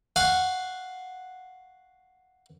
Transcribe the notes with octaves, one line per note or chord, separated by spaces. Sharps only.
F5 F#5 G#5 C#6